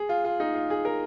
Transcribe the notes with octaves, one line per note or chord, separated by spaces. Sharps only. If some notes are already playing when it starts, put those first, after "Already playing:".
Already playing: G#4
F4
F4
D#4
F4
G#4
A#4